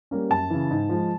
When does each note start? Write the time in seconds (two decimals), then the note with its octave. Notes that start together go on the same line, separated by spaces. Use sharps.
0.11 G3 A#3 C#4
0.30 F#2 A5
0.50 C#3 E3
0.71 G#2
0.89 F3 G#3